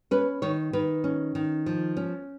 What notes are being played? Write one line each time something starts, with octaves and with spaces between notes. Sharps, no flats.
C#4 B4
D#3 C#5
D#3 B4
C#4
D#3
F3
C#4